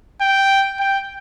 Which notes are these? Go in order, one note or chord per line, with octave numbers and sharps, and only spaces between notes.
G5
G5